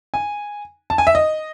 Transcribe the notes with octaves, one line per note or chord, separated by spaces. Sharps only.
G#5
A5
G#5
E5
D#5